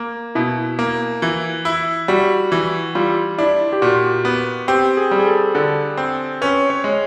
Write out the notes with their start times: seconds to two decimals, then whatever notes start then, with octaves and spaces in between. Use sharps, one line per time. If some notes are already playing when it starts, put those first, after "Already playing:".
Already playing: A#3
0.35 B2 E4
0.79 A#3
1.22 E3
1.65 E4
2.08 G3 F#4
2.52 E3
2.95 G3 F4
3.38 D4 E4
3.73 G4
3.82 A#2 F#4
4.25 B3
4.68 C4 G4
4.97 G#4
5.11 G3
5.19 G#4
5.26 A4
5.55 D3 A4
5.97 C4
6.41 C#4 B4
6.70 C#5
6.84 G#3